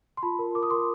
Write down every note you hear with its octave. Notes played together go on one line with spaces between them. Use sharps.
C6
F4 A5 B5
A#4
A#4 D6
D#6
A#4 C6 D6